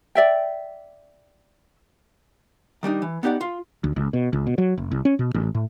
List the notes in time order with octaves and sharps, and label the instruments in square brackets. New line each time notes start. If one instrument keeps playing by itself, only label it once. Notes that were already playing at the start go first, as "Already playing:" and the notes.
[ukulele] D5 E5 G5
[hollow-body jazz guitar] D#3 G3 D4 D#4
E3
B3 D#4 G4 D5 F#5
F4
[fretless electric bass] D2
C#2
B2
C#2
B2
F#3
F#1
C2
C#4
B2
A1
A2